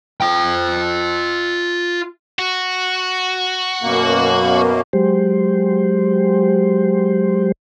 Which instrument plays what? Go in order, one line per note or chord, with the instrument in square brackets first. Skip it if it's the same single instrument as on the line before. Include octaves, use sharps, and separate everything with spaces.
[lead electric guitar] F4 G5
[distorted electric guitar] F#4
[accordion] F#2 B2 A#3
[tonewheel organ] F#3 G#3 G4 C5